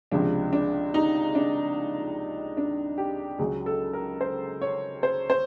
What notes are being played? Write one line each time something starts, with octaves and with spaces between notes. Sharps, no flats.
C#2 C3 F3 G#3 D4
D4
D#4
D4
D4
G4
C#2 C#3 F#3 G#4
A4
A#4
C5
C#5
C5
C5